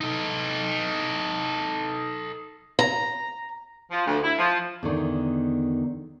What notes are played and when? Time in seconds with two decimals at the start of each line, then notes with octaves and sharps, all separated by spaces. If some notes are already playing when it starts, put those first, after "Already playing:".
0.01 D#4 A4
2.79 A#5
3.91 F3
4.06 D2
4.23 E4
4.38 F3
4.83 E2 D3 D#3